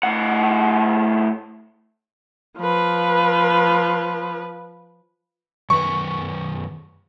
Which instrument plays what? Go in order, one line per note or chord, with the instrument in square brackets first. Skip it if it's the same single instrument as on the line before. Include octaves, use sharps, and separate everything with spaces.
[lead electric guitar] A2 F#5
[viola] F3 B4
[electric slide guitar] F#2 D#3 B4 [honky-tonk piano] C#6